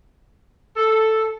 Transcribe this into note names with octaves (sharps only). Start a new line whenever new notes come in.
A4